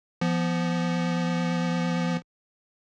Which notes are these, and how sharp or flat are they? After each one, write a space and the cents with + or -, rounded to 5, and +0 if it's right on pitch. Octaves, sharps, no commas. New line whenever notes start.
F3 -20 B3 +5